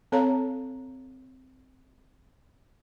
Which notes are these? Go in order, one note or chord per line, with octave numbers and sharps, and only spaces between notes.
C4 A4 C#5 F5 A#5